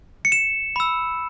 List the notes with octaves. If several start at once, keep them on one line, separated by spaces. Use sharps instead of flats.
C#7
E7
B5 E6